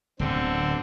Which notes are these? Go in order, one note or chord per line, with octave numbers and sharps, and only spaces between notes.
D1 B2 D3 C4